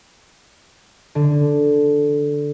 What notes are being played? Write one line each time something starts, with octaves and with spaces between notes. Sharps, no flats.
D3